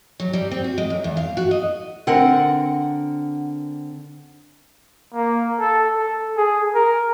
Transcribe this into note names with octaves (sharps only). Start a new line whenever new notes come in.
F#3
G3
C4
F#4
G#3
F#2
E2
F5
F#4
D#5
D3 C4 A#4 F#5
A#3
A4
A4
G#4
A#4